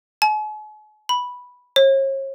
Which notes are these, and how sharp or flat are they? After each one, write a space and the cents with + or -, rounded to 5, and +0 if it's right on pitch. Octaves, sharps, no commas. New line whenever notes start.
G#5 +45
B5 -5
C#5 -40